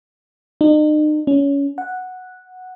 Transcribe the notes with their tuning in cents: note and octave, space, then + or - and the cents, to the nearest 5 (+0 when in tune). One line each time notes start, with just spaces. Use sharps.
D#4 -40
C#4 +20
F#5 -5